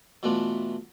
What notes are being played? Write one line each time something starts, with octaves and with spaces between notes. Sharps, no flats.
B2 E3 A3 B3 D4 F4